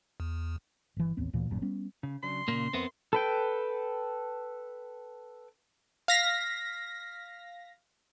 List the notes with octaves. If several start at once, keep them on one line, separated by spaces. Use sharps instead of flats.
E2
G1 E3
A1 D#2 B3 C4
D2 A#2 E3
G#1 F#2 A#2
G3 B3 C#4
C#3
C#3 F#3 D4 C6
A#2 C#3 A#3
F2 B3 C4 A#4 E5
A4 B4 G5
F5 A#6 B6